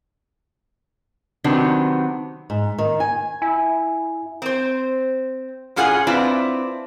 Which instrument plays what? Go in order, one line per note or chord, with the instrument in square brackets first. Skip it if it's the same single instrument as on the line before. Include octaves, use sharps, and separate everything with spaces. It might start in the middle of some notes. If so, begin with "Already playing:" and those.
[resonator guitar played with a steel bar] C3 D#3 F#3 B3 C4 D4
[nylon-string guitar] G#2
D#3
G#5
[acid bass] E4 [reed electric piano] G#5
[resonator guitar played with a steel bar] C4 C5
A2 C#4 F4 G#4 F#5 G#5
C4 D4 E4 F4 B4